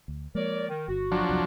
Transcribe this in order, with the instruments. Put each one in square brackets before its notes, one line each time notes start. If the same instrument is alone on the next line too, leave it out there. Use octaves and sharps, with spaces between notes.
[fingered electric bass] D2
[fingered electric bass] F3 G#3 A#3 [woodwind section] A#4 C#5 D5
[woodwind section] D#3
[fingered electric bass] G1 [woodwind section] F#4
[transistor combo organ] F3 F#3 D4
[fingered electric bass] C2 F2